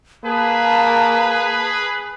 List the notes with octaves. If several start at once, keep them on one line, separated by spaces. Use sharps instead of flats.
A#3 G#4 B4 A5